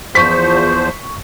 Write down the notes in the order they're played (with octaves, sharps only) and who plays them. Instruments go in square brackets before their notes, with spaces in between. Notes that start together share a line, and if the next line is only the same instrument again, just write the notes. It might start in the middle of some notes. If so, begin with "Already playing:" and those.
[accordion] E2 F3 C5 [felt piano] C#6 B6